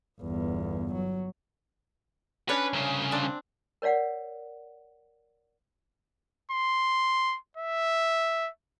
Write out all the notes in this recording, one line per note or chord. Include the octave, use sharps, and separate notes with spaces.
G1 E2
F#3
C#4 D4 B4 C#5
C2 C#3
C4 D4
A#4 C#5 D5 F5 F#5
C6
E5